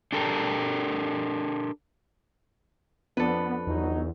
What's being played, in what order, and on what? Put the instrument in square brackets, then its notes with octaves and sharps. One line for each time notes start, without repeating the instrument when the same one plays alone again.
[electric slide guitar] D4 G4 A4 A#4
[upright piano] F2 D4 [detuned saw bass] B3 [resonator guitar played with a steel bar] A4 B4
[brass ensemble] G1 F#3 D#4 [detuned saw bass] E2